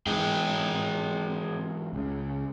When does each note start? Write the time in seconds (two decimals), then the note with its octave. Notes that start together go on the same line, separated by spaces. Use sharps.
0.07 G#2 E3 C4 G#4 G5
1.93 C#2 C#3